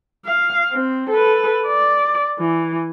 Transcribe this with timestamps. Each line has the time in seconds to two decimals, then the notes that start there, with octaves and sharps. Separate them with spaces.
0.25 F5
0.72 C4
1.10 A4 B4
1.67 D5
2.39 E3